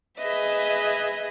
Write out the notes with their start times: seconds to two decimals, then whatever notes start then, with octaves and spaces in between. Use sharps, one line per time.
0.18 G#4 B4 D#5 E5